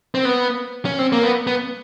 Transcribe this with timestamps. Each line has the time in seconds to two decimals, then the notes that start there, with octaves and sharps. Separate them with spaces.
0.15 C4
0.25 B3
0.85 C#4
0.99 C4
1.12 A#3
1.23 B3
1.47 B3